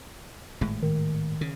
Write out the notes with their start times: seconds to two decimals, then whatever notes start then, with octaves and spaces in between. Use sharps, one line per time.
0.61 G#1 A2 G#3
0.83 D#3
1.41 C#3